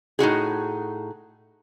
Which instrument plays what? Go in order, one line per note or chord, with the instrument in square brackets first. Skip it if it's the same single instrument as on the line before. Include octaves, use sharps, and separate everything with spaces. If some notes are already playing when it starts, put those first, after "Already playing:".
[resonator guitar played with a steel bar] A2 D#4 F#4 G#4